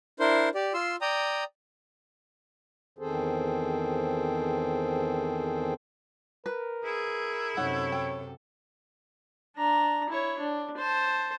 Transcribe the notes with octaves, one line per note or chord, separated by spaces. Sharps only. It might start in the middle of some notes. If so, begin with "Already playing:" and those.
D4 E4 A#4 C5 C6
G4 D5
F4 C6 E6
D5 G5 A#5 D#6
E2 D#3 C4 G#4 A4 C5
A#4 B4
E4 G#4
F#2 C3 D#4 A4 C#5 F#5
G5
D4 A#5
E4 C#5
D4
C5 A5